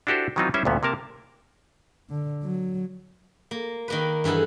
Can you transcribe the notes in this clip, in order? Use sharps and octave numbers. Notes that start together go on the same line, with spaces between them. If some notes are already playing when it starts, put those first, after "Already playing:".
D4 E4 F#4 G4 A4 C5
D#3 E3 F#3 C4 D#4 F4
G3 C#4 E4 B4 C5 E5
D2 G2 A#2 B3 C#4
C3 A#3 A#4 A5
D3
F#3
A#3
D#3 A#3 B4
G2 E3 G#4 A4 F#5